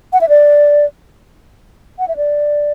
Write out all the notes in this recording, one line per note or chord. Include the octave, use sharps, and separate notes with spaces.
F#5
E5
D5
F#5
E5
D5